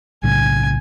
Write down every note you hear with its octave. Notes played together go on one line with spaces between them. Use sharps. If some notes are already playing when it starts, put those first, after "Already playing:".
B1 A2 C#3 G#5